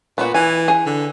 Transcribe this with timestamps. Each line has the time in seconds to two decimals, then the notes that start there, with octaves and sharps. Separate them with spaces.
0.18 A#2 B3 F#4
0.34 E3 G#5
0.68 G#4
0.86 D3